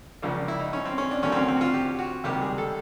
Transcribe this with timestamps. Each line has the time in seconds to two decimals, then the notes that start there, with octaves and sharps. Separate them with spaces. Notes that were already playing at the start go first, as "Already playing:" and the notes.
0.22 C#2 C#3 F3 A#3 D4
0.35 D4
0.48 E4
0.60 D#4
0.73 C#4
0.85 C4
0.98 C#4
1.11 D4
1.23 D2 D3 F#3 A#3 C#4
1.32 C4
1.36 C#4
1.48 C4
1.57 F#4
1.61 F4
1.74 G4
1.99 F#4
2.24 C#2 C3 D#3 G3 A#3 G4
2.42 G#4
2.58 A4